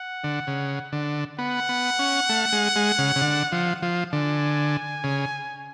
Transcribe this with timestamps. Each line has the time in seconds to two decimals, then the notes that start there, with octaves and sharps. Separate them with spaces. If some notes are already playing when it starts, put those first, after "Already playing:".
Already playing: F#5
0.24 D3
0.47 C#3
0.92 D3
1.39 B3 F#5
1.69 B3
1.99 C#4
2.29 A3
2.52 G#3
2.76 G#3
2.98 C#3
3.16 C#3
3.22 D3
3.52 F3
3.82 F3
4.12 D3 G#5
5.04 C#3